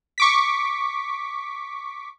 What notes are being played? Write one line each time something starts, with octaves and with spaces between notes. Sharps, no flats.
C#6 D6 B6